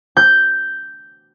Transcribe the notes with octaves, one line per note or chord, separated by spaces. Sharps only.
G6